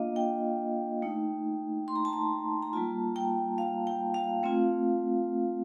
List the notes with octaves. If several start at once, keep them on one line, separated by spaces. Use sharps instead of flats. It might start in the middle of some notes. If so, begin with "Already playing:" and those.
Already playing: A#3 D4 F4 D#5 F5
G5
A3 D#4
C6
A#5
A5
A#5
A#5
G3 A#3 F4 A5
G5
F5
G5
F5
A3 C4 F4